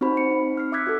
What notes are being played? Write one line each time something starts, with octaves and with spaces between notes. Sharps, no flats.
C4 D#4 F#4 C5 B5
C#7
D#4
F6 C7
E5 D6 E6 F#6 G#6 B6
F#4 A4